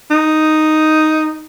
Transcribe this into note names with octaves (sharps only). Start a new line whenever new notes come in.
D#4